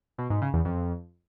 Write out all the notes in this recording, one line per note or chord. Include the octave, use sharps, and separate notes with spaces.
B2
G#2
C#3
E2
F2